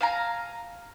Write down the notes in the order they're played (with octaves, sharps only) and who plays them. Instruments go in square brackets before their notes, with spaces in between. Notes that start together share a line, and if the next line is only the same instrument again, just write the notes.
[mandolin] F5 G#5 A#5